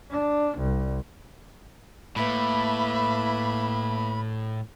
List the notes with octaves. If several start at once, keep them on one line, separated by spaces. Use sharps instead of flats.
D4
C2
A2 A#3 B4 E5 B5